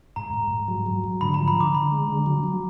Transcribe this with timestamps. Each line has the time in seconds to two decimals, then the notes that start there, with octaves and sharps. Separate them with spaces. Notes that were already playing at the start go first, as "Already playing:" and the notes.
0.16 G#2 A#5
0.34 G#2
0.51 G#2
0.68 F#3
0.86 F#3
1.04 G#2
1.21 D3 B5
1.34 A#5
1.39 F3
1.48 B5
1.56 D3 D6
1.74 D3 B5
1.92 G#3
2.09 D3
2.26 F#3
2.44 F#3